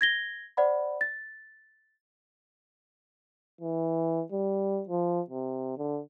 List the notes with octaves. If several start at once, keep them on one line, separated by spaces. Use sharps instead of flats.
G#6 A#6 G7
C5 D5 F#5 B5
A6
E3
G3
F3
C3
D3